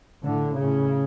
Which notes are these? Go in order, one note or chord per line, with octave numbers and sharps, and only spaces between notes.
A2 D3
A2 C#3